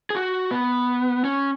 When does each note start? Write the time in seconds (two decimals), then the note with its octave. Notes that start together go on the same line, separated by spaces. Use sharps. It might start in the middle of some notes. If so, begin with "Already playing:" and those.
0.10 G#4
0.15 F#4
0.51 B3
1.24 C#4